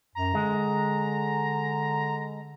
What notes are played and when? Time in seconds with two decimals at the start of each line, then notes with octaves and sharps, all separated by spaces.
0.15 F#2 A#5
0.35 D3 G#3